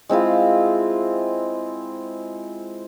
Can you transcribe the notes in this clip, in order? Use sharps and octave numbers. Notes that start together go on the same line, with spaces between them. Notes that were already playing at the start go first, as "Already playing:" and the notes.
G#3 C4 E4 F4